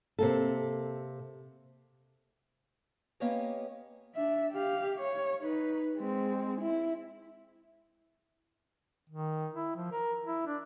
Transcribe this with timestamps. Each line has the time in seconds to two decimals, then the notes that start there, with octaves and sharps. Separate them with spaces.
0.19 C3 A#3 A4
3.20 A#3 B3 C#4 G4 C#5 D#5
4.15 D4 E5
4.52 G4 F5
4.99 C#5
5.42 D#4 B4
5.97 G#3 C4
6.61 E4
9.10 D#3
9.54 E4
9.76 F3
9.92 A#4
10.25 E4
10.47 D4